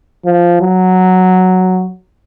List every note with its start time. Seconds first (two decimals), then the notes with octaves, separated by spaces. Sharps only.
0.25 F3
0.61 F#3